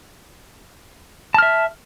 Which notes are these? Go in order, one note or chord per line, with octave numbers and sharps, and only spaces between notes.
E5 A5 F6